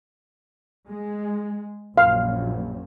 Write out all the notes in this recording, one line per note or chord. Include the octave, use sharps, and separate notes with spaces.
G#3
A#1 F#2 F5